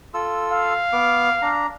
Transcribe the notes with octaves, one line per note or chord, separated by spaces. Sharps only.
F4 A4 E6
F5
B3 D6
D4 A#5